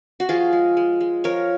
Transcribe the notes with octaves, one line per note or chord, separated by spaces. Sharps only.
F#4
F3 F4 G#4
G#3
G#3
G#3
F3 A#4 C#5